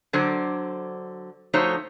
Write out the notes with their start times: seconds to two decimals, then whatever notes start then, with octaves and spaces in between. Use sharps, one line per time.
0.13 D3 F#3 C5 D5
1.53 F3 A3 D#4 F#4 C5 C#5